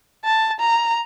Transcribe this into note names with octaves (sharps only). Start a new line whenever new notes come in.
A5
A#5